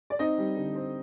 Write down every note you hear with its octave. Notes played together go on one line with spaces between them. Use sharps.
D5
C4 D#4 D#5
G3
D3
C4